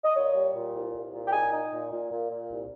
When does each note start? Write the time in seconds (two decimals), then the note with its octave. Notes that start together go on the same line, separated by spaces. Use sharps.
0.03 D#5
0.15 A#2 C#5
0.35 G3
0.54 A#2
0.74 C2
0.93 C2
1.13 A#2
1.26 G5
1.33 D#4 G#5
1.52 D#4
1.71 A#2
1.91 A#2
2.10 A#2
2.30 A#2
2.50 C2